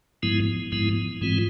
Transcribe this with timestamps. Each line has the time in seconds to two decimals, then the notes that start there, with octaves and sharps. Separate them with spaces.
0.23 G#2 F3 G#3 B3 E4
0.72 G#2 F3 G#3 B3 E4
1.21 G#2 E3 G#3 C4 F4